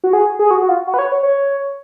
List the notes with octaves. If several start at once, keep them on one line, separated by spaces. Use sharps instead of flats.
F#4
G#4
G#4
F#4
F#4
F4
F#4
B4
C#5
C#5
C#5